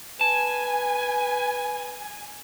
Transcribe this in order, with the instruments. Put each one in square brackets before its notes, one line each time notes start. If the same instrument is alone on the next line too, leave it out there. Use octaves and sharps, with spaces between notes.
[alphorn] B4 [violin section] G#5 [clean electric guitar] A5